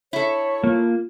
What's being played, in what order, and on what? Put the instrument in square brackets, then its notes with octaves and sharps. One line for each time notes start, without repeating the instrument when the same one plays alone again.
[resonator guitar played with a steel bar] E4 A4 [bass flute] C#5
[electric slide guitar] A#3 [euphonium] F4